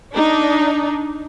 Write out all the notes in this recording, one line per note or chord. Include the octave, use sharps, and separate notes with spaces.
D4 D#4